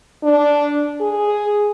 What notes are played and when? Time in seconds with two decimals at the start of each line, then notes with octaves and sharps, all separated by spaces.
0.24 D4
1.01 G#4